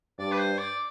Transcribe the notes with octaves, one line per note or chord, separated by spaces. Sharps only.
G2 D5
B4
C5
D5